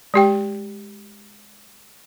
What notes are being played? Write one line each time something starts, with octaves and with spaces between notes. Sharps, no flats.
G#3 G4 G5